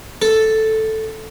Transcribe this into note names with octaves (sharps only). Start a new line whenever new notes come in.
A4